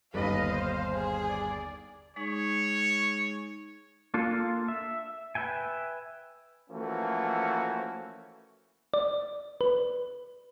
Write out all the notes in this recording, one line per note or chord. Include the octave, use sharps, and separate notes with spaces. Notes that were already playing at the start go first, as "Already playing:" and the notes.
G1 D#2 B4 D#5 F5
C5
G#4
D5
G#3 D#4 G#4 C#5
A#3 D4 F4 A4
E5
B4 E5 G5 G#5
E3 F3 A3 A#3 C#4 F#4
D5
B4